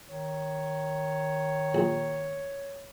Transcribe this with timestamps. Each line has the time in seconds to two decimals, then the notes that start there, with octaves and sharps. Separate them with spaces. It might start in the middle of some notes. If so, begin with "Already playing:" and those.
0.09 D#3 C#5
1.75 A#1